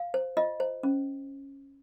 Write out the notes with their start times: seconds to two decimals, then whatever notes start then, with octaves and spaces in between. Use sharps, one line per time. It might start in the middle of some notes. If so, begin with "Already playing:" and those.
Already playing: F5
0.14 C5
0.37 F4 D#5
0.60 C5
0.83 C#4